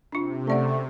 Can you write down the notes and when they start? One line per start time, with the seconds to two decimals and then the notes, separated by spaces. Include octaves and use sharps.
0.12 C3 D4 F4
0.47 A3 C#4 D5 F#5